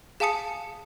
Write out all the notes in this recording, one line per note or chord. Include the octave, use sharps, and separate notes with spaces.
G#4 F5 G#5 A5 D#6 C#7